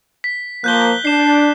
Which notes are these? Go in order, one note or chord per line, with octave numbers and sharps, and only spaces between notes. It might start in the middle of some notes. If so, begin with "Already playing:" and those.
B6
F3 A#3 F#6 G6 G7
D4 C7 E7